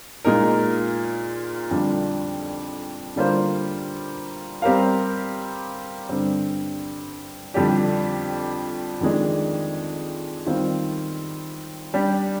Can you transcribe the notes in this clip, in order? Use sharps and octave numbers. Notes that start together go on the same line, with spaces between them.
A#2 G#3 D#4 A#4
F2 D3 G3 D4 F4
D3 G3 A#3 F4 C5
G3 C4 G4 A#4 F5
G2 D3 G3 C4
F2 D3 G3 D4 G4
F2 D#3 G#3 D4
D#3 G3 C4 F4
G3 D4 G4